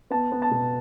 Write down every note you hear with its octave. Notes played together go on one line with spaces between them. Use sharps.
B3 A5
B3
A5
B2